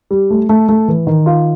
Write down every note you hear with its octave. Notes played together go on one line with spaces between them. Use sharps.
G3
A3
A3
A3
E3
D#3
F4